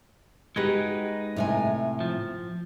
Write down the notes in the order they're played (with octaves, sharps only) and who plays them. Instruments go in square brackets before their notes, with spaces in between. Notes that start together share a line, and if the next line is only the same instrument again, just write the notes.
[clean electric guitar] G#3 D#4 B4 [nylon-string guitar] F#4 G4
[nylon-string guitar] A2 C3 G#5
[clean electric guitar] F3